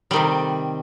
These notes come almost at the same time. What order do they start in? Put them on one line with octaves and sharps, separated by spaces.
G3 D#3 C3